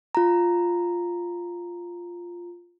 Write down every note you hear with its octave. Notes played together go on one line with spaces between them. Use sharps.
F4 A#5